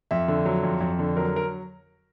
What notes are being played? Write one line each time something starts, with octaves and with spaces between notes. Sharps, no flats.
F2 E5
D3
F#3
F2
F2
D3
F#3 A#4
A#4